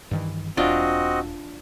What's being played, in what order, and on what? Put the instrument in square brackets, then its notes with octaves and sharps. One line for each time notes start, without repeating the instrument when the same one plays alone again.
[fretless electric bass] G2 D#3 E3
[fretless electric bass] E1 [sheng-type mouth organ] C4 F#4 D#5 [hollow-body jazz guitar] D4 F4